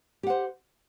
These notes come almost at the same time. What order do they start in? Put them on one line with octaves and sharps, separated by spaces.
G4 F#5 C5